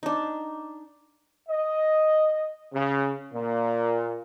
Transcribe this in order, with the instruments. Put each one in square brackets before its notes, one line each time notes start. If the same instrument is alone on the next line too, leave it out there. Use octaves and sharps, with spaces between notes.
[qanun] D4 D#4
[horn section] D#5
C#3
A#2